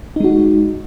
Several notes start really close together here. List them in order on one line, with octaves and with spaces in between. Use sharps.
D#4 G#3 F#4